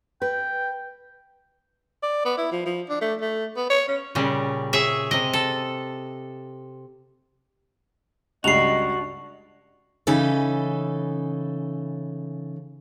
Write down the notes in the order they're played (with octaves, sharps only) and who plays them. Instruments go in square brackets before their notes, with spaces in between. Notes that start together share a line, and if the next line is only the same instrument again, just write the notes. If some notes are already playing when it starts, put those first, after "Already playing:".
[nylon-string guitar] B4 [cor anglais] G5
[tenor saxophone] D5
B3
E4
F3
F3
D4
A3
A3
B3
C#5
C#4
[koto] A#2 C#3 G3
G#4 C#5 E5
C3 D#5
A4
[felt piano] C#2 G2 C#3 [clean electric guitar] D4 F#4 [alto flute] D#5 [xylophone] C7 F7
[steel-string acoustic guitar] C#3 E3 C#4 D#4 A4 B4